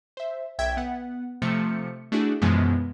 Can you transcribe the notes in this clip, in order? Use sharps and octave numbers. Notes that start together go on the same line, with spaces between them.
C5 E5
B1 E5 G5 G#6
B3 F#5
C3 F3 A3 C#7
A3 D4 E4 F#4 G#4
F#2 B2 E3 F3 G#3 B3